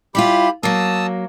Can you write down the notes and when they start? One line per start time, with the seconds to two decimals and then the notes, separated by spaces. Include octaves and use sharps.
0.15 G3 E4 F4 G4 B5
0.63 F#3 A#3 A5 D#6 E6